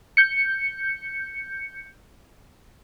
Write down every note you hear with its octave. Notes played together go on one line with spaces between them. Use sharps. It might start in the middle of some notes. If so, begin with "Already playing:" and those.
G6 C#7